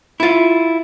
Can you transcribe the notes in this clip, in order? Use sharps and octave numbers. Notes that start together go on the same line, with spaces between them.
E4 F4